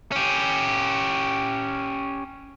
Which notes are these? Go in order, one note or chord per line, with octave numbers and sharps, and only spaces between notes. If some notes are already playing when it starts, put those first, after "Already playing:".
C#4 G4